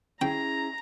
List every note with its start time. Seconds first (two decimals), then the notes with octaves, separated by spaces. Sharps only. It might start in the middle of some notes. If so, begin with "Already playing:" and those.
0.21 C#4 E4 G#4 G5 A#5